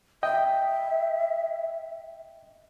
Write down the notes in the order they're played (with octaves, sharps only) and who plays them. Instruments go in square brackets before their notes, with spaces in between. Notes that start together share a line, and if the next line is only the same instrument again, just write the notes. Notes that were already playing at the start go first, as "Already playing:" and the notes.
[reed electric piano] D#5 G5 [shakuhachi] E5